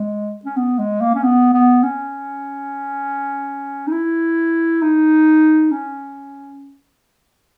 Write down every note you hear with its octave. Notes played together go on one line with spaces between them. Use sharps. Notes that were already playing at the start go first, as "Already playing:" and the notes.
Already playing: G#3
C#4
B3
G#3
A#3
C#4
B3
B3
C#4
D#4
E4
D#4
C#4